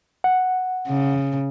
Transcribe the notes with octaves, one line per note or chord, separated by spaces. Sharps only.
F#5
C#3